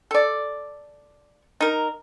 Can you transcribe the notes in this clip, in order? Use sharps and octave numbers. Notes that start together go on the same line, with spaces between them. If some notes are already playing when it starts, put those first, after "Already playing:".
A4 D5
D#4 A#4